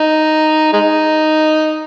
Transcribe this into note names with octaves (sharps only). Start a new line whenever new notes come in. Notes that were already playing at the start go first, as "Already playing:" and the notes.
Already playing: D#4
G#3 D#4